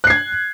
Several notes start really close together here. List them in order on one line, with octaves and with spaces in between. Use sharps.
F#6 C7 G#6